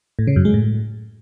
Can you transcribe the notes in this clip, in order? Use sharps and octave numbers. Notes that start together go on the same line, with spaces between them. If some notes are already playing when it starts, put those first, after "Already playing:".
A2
C#3
F#2
G#3
A2